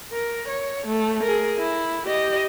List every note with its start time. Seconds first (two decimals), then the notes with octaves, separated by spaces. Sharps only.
0.12 A#4
0.48 C#5
0.86 A3
1.23 G#4 A#4
1.58 E4
2.06 G4 D#5